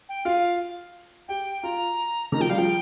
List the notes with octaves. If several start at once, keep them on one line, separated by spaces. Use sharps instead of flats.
G5
F4 F5
G4 G5
F4 A#5
D#3 A#5
F3 G5
G3 F5
F3 G5